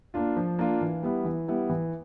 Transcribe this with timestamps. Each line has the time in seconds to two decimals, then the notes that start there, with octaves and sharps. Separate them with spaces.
0.14 A#3 D4 F4
0.37 F3
0.59 A#3 D4 F4
0.81 E3
1.03 G3 B3 E4
1.25 E3
1.48 G3 B3 E4
1.69 E3